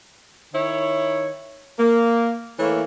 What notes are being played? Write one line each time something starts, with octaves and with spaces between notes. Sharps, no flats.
D#3 E4 C#5
A#3
E3 A3 A#3 A4 C#5